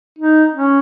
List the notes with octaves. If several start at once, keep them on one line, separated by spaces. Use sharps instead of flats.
D#4
C#4